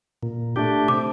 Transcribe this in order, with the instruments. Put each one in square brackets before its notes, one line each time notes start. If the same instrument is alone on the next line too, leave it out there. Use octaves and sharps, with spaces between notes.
[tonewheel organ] A#2
A3 D4 G4
[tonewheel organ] C3 [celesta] D6